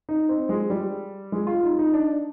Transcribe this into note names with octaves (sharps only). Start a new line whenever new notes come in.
D#4
C4
G#3
G3
G#3
F4
D#4
D#4
D4